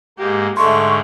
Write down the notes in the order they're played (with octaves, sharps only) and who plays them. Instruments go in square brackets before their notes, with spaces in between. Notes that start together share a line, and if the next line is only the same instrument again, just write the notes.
[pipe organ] G#2 A#3 [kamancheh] G4
[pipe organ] G#2 D3 [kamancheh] A3 [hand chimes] C6 [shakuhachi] C#6